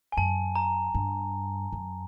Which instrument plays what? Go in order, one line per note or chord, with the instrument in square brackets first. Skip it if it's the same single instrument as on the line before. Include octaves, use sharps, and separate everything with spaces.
[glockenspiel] G#5
[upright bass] F#2 [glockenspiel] A5
[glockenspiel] A#5
[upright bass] G2
F#2